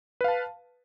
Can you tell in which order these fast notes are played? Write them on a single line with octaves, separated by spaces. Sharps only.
B4 F5 A5